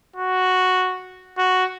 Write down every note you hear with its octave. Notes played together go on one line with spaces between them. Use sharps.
F#4
F#4